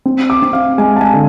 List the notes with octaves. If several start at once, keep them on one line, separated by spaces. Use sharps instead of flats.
C4
D6
C4
F5
G#3 G#5
A5
G#5
D3